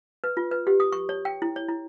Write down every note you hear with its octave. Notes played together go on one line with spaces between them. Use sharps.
B4
F4
B4
G4
D#6
C#6
C#5
G5
E4
C#5
E4